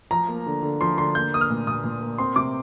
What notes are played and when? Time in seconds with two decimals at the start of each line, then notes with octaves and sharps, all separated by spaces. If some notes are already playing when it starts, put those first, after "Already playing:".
0.11 F3 A#5
0.28 A#3
0.46 D3
0.63 D3
0.81 F3 C6
0.98 D3 C6
1.15 A#3 G6
1.32 A#3 D#6
1.41 F6
1.50 A#2
1.67 A#2 D#6
1.84 A#2
2.02 A#3
2.18 C4 C6
2.36 C3 D6